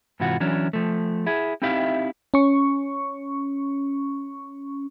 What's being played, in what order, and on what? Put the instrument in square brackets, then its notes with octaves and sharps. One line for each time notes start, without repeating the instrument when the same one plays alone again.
[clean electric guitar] G#2 C3 E3 F4 F#4
E3 F#3 C#4 D4
F3 A3
E4 G#4
C4 D#4 E4 G4 E5 F5
[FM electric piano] C#4 C#6